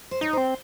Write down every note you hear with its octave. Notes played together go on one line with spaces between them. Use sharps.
C5
D#4 C#5
C4 C5